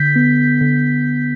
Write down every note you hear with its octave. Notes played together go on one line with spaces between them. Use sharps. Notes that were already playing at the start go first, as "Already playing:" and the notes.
Already playing: D3 G6 B6
B3
D3